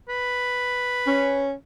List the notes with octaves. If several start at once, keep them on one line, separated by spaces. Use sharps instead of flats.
B4
C#4